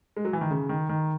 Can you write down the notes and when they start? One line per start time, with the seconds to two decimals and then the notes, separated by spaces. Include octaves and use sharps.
0.17 G#3
0.25 F#3
0.33 E3
0.41 D#3
0.51 C#3
0.69 D#3
0.89 D#3